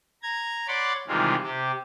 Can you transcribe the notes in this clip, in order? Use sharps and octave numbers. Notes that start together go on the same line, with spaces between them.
A#5 G#6
C#5 D5 F#5 B5 C6 D6
C3 D#3 E3 G3 G#3 F4
C3 G4